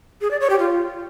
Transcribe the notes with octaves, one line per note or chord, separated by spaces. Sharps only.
G#4
D5
C#5
G4
F4